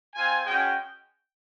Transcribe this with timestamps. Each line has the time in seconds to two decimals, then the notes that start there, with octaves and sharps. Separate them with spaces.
0.15 C4 F4 G#5
0.44 G#3 C#4 F#4 G5